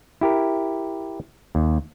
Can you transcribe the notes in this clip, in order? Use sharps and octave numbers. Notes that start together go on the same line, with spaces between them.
E4 G4 A#4
D#2